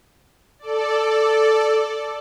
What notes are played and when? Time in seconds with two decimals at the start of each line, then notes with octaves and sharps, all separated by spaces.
0.59 A4 D5